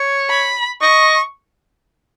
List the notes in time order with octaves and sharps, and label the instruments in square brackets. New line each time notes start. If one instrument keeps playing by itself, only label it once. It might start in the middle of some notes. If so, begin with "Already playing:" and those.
Already playing: [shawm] C#5
[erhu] B5
[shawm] D#5 [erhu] C#6